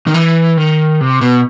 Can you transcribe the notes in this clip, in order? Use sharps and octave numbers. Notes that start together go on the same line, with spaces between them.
D#3
E3
D#3
C3
B2